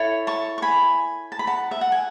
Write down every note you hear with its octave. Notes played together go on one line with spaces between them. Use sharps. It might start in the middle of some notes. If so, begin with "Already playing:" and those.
Already playing: E4 A4 C#5
A5 C#6
C#6
G#5 B5
A5
B5
F#5 A5
E5
F#5
G#5